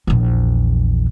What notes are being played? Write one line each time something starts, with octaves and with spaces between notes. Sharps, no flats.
A#1 E2